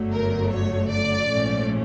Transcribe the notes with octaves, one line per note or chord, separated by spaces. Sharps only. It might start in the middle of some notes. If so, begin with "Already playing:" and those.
Already playing: G1 F#2 D3 F#3 A3
A#4
C#5
D5
A#1 G#2 F3 A3 C#4